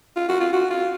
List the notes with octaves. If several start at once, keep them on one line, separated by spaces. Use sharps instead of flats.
F4
F#4
F4
F#4
F4